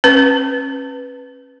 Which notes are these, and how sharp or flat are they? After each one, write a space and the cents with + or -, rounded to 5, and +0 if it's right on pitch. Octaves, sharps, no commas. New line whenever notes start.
C#4 -30 B4 +0